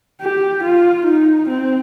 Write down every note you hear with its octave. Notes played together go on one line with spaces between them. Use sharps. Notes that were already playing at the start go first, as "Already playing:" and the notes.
G4
F4
D#4
C4